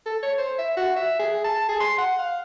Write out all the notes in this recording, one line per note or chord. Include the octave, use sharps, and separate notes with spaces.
A4
C#5
C5
E5
F#4
E5
G#4
A5
G#4
C6
F#5
F5